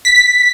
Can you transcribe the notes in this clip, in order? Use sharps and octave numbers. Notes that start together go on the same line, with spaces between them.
B6